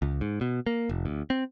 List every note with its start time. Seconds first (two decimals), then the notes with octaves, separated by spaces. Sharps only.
0.02 C#2
0.21 G#2
0.41 B2
0.66 A#3
0.89 F1
1.06 D2
1.30 C4